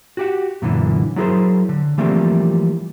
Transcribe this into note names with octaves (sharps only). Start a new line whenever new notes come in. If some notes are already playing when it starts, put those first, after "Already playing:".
F#4 G4 F#5
F#2 A#2 D3 E3
F#3 E4 G#4 A#4 C5
D3
E3 F3 G3 A3 A#3 C4